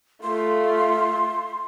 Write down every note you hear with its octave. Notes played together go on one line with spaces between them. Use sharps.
A3 F4 C6